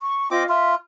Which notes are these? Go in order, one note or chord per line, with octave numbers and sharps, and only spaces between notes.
C#6
C4 F4 D#5 D6
F4 E5